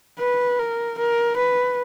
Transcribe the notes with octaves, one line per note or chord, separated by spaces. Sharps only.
B4
A#4
A#4
B4